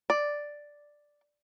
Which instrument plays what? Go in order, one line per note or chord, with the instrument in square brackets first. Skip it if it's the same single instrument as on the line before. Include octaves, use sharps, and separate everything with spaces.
[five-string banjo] D5